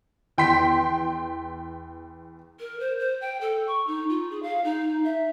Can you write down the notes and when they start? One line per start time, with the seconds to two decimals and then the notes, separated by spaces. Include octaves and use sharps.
0.38 E2 G5 C6 B6
2.60 A#4
2.80 C5
2.99 C5
3.21 G5
3.41 A4
3.67 C#6
3.87 D#4
4.09 F4
4.31 G#4
4.43 F5
4.64 D#4
5.04 E5